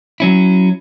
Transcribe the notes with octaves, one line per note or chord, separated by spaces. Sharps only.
F#3 C#4 E4